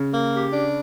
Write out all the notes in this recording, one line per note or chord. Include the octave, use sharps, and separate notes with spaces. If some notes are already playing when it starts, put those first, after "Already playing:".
Already playing: C#3
A#3
G4
D4